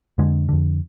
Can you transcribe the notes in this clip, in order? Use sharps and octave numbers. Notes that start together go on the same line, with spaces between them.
F2 D3 G#3
F2 D3